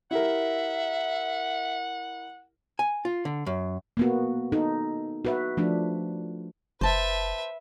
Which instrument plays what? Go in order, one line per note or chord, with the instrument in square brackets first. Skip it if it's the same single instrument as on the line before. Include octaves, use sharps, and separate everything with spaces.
[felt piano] E4 G4 A#4 [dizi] E5 [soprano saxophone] F#5
[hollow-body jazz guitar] G#5
F4
D3
F#2
[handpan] A#3 B3 F#4
D#4 A4
F#4 B4 E5
F3 A3 D4
[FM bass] F#1 [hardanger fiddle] B4 E5 [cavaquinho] C5 A5